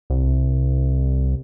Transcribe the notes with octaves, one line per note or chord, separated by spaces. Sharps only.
C2